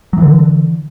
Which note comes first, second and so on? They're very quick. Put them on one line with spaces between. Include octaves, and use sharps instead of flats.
F#3 E3 D3